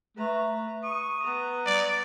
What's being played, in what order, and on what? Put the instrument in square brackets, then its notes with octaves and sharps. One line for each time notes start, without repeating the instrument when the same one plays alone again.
[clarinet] A3 [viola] B4 A#5
[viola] C#6 [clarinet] D#6
[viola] B3 A#5
[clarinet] G3 [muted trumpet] D5